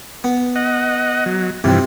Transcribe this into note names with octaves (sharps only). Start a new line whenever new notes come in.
B3
D#5 F#5
F#3
G2 C3 E3 F3 C4